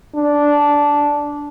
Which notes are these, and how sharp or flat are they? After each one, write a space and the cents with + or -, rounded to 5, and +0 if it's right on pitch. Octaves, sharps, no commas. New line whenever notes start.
D4 -10